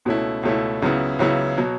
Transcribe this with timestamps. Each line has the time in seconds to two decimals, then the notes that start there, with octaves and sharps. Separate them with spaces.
0.05 C#2 B2 A3 C#4 E4
0.43 C#2 B2 A3 C#4 E4
0.82 C#2 C#3 F#3 B3 E4
1.19 C#2 C#3 F#3 B3 E4
1.58 B2 F#3